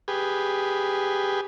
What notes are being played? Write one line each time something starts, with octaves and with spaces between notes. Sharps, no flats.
G4 G#4 B4